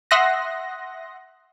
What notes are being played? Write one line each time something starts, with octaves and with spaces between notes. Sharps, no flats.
E5 F#5 C6 D#6 F#6 A#6